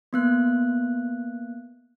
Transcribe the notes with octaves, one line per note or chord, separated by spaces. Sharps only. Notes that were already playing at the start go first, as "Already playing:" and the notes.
A#3 B3 F#6